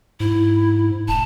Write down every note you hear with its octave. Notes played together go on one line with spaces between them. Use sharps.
G#2 E4
E1 A5